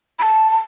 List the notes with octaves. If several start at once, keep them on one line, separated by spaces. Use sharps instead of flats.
B5
A5
A5